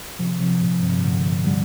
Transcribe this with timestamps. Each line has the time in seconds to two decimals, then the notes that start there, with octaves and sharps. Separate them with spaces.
0.19 C3 F3
0.40 C3 F3
0.61 A2
0.82 G2 C3
1.03 A2 D3
1.46 D3 G3